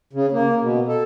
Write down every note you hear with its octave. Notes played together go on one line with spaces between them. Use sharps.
C#3
A#3
B2
A4